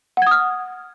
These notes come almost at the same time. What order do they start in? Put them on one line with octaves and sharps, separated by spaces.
F#5 G#6 D#6 F6